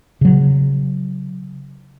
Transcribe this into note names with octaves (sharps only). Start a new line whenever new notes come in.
C#3 F#3